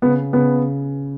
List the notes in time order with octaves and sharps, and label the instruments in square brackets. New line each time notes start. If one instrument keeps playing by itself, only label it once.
[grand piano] C#3 [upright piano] B3
[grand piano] C#3 [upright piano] B3